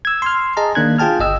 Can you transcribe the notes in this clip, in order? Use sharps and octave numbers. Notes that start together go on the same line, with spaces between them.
E6 G#6
C6 F6
G#4 D#5 A5 A#5
D#3 A#3 D4 F#6 G#6
F4 G#4 G5 A5 F6
G1 D#5 E6